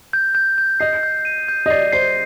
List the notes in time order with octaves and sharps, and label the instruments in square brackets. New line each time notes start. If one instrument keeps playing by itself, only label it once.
[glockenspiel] G6
G6
G6
[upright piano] D#5 [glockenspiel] C7
[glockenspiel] G6
D#7
G6
[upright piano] D#5
[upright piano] D5 [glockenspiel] C7
[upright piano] C5 [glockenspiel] C7